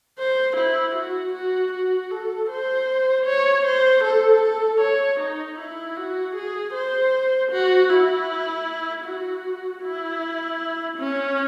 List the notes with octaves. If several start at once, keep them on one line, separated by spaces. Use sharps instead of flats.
C5
E4
F#4
F#4
F#4
A4
C5
C#5
C5
A4
A4
C#5
D#4
E4
F#4
G#4
C5
F#4
E4
F#4
E4
C#4